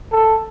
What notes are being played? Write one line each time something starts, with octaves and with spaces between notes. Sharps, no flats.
A4